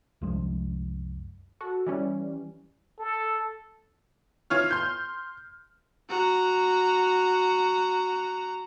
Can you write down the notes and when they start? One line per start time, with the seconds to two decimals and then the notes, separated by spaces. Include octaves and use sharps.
0.22 C2 F#2 F3 G#3
1.61 F#4 A4
1.87 E3 G3 C#4
2.99 A4
4.50 E3 F4 C#5 F6
4.71 C6 G6
6.09 F#4 A#5